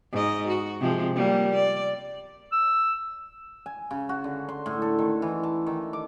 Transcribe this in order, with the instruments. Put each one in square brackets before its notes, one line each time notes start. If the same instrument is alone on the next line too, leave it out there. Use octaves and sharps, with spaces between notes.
[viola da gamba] G#2 D#5
F#4
C3 F3 G#3
G3 A#3
D5
[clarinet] E6
[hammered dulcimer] G#5
C#3
F#4
D3
C6
A2
A4
D#3
E3
A5
D#3
D6